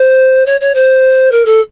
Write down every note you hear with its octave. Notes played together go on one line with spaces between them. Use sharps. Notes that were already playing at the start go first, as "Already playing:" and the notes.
Already playing: C5
C#5
C#5
C5
A#4
A4